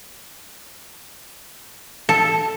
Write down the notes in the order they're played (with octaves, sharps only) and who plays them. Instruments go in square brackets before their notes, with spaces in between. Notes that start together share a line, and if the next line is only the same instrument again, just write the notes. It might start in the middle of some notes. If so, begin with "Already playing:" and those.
[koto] A4